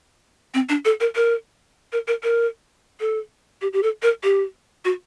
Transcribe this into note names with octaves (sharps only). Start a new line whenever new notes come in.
C4
D4
A4
A#4
A#4
A#4
A#4
A#4
A4
G4
G4
A4
A#4
G4
F#4